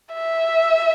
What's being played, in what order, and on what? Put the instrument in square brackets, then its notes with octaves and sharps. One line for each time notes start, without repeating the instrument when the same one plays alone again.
[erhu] E5